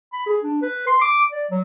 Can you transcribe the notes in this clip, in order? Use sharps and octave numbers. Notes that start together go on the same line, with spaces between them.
B5
G#4
D4
B4
C6
D6
D5
F#3